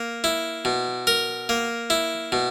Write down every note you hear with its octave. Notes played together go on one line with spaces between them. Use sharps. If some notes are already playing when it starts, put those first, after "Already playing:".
Already playing: A#3
E4
B2
A#4
A#3
E4
B2